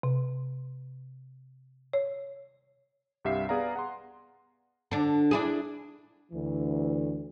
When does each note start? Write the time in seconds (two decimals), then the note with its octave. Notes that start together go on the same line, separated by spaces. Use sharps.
0.03 C3
1.93 C#5
3.25 C2 G2 G4 E5 F5 C7
3.49 B3 G#4 D5 F5 A#5
3.76 F#5 A#5 C6
4.91 D3 D4
5.31 D4 E4 G#4
6.32 D2 E3